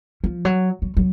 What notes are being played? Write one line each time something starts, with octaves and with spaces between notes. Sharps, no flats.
F3
F#3
F#3
F#3